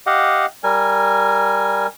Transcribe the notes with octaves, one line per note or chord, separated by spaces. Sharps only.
G4 D#5 F5 F#5
G3 A#4 G#5